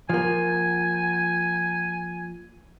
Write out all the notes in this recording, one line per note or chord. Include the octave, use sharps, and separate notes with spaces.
F3 A#3 G#5